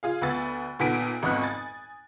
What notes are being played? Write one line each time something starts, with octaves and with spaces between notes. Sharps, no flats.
F4 G#4 F5
D2 B3 B5 E6 A6
A#2 D#3 B3 A4 B6 D7
G#1 F2 B3 C#6 D#6 F#6
G#5 A6